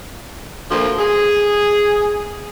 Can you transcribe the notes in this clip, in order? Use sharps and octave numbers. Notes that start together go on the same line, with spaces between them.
D2 F3 A#3 F4
G#4